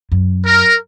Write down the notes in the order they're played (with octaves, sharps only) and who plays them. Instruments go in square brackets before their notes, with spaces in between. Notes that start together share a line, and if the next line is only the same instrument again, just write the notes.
[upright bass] F#2
[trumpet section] A#4